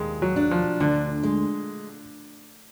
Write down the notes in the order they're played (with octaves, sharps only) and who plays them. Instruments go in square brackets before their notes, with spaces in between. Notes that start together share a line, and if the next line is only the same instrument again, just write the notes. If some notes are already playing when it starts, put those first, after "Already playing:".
Already playing: [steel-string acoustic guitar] D#2 [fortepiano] G#3
[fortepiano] F#3
[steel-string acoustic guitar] D4
[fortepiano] F3
[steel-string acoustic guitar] D2 [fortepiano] D3
[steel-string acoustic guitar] G#3